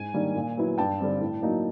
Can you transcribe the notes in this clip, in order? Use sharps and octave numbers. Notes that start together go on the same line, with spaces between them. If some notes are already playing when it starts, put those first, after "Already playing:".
Already playing: G#2 G#5
D#3 G3 A#3 D4
A#2
F#3 B3 E4
G2 G5 A5
D3 G3 C4
A2
F#3 A#3 D#4